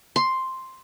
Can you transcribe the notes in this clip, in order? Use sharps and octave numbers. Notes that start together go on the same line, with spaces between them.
C6